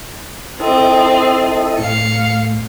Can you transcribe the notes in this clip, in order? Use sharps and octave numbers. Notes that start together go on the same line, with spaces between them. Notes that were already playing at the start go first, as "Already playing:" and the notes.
C4 E4 A4 D#5
A2 F5 C#7